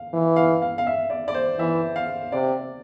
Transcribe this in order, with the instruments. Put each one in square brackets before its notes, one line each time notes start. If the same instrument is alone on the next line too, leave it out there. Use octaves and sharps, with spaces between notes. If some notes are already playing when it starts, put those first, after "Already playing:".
Already playing: [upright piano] F5
[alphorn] E3
[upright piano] F5
F5
F5
E5
D5
D5
C5
[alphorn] E3 [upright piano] E5
[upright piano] F5
[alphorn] C3 [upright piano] D5